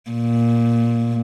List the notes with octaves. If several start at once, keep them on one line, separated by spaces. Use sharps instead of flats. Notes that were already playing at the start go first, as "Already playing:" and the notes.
A#2